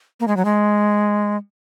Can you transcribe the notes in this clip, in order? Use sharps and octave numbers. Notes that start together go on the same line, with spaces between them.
A#3
G#3
F#3
G#3